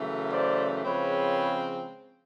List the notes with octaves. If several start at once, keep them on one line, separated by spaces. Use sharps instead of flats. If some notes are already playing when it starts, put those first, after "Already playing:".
Already playing: F#2 C#3 E3 A3
C5 D5
C#3 F3 G#3 C4 B4 C#5